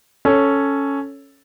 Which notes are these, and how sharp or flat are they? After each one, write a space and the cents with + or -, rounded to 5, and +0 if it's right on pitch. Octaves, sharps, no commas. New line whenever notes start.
C#4 +0 A4 +0 C#5 +0